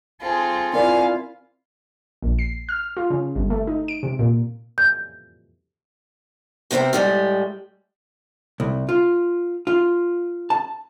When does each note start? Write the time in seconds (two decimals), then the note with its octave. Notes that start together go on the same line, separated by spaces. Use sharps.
0.21 C4 F4 G#4 A4
0.74 C4 E4 F4 A#4 D5 F5 G#5
2.23 A#1
2.39 C7
2.69 F6
2.97 F4
3.10 C#3
3.35 G1
3.50 A3
3.67 D#4
3.88 D7
4.03 C3
4.19 A#2
4.78 G6
6.71 C3 B3 C4 A#4 G5
6.93 A2 G3 G#3
8.60 C2
8.89 F4
9.67 F4
10.50 A5